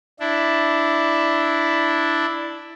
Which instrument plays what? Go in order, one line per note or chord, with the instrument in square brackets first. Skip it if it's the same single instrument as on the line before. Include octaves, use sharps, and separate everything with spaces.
[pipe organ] D4 E4